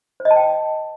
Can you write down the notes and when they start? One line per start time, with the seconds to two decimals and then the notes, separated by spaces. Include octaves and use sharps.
0.20 C5
0.25 D#5
0.31 A5
0.36 G5